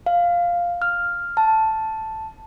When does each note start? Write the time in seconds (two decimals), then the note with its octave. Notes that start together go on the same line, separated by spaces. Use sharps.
0.06 F5
0.82 F6
1.37 A5